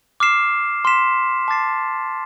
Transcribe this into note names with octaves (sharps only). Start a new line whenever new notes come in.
D6 F6 C7 E7
C6 F6 B6 E7
A5 D6 A6 C7